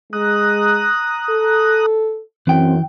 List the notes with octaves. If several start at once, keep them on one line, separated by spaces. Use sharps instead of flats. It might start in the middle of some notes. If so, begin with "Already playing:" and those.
G#3 A#5 D#6 F#6
A4
F#2 E3 C4 G5